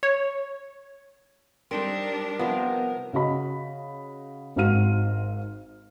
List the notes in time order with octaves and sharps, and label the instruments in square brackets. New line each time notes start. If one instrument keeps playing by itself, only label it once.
[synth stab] C#5
[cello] G3 D4 [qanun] C4 D#4 A4 [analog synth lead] A#4
[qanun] C3 F3 [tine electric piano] B3 [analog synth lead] A#4
[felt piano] C#3 F#4 D#5 B5
G#1 G#2 F#4 F5 F6 D#7